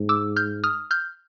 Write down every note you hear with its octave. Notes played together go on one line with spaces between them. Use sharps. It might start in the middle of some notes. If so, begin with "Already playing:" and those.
Already playing: G#2
D6 E6
F6 G6
D#6 F6
F6 G6